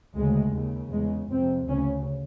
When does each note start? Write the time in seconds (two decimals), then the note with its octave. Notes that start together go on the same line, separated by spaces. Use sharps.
0.15 D2 C#3 G#3
0.54 D#2 C#3
0.91 E2 C#3 G#3
1.30 F2 C3 C4
1.68 D2 C#3 C#4